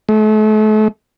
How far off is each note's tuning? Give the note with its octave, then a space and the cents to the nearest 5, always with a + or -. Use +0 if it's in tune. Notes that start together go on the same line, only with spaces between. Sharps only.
A3 -40